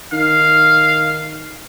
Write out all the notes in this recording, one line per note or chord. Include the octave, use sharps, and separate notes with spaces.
D#3 F5